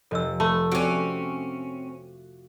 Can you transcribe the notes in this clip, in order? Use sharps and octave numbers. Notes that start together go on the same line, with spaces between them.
F1 A4 D#5 E6
A3 A5 B5 C6
C4 C#4 F#4 D6